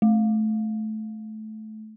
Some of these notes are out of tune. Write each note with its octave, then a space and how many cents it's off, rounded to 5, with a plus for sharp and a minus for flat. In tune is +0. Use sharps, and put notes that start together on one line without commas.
A3 -20